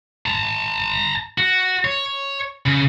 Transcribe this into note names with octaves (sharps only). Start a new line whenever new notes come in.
A5 A#5
F#4
C#5
C#3